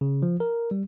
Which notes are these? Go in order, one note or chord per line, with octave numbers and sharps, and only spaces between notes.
C#3
F3
A#4
G3